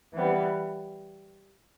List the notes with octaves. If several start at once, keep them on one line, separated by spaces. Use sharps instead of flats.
E3 G3 B3